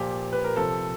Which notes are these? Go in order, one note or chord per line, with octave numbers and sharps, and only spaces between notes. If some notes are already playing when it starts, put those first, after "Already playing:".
Already playing: A#2 F3 G4
B4
A#4
C3 F3 A4